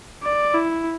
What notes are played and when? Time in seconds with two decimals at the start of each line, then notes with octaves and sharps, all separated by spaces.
0.24 D5
0.55 E4